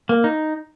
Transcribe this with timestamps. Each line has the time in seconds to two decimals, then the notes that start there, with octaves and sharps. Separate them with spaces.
0.09 A#3
0.24 D#4